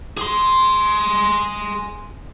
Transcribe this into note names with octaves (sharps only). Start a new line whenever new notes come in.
G#4 C6